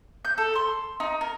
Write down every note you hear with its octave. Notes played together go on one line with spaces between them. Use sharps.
G6
A4
C6
D#4
A#4